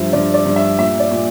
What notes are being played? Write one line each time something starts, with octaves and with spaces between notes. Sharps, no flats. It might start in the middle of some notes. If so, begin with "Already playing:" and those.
Already playing: G2 F3 E5
G2 D5
D5
G2
E5
A#2 E5
D5
A#2